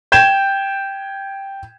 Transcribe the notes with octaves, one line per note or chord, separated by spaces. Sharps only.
G5 G6 G#6 E7